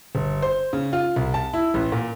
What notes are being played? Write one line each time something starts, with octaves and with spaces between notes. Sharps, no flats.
G1
C5
C#3
F4
C2
A5
E4
A1
A#2